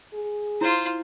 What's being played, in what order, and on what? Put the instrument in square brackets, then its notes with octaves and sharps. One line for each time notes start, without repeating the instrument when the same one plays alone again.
[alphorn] G#4
[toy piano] E4 [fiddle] F4 C5